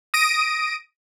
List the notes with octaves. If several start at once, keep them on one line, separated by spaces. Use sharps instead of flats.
D#6 A#6 D7 D#7